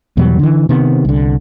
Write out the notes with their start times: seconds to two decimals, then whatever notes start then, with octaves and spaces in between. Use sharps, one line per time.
0.17 E2 B2 F#3 G3
0.39 D3 E3
0.69 C3 D#3 B3
1.05 C2 D3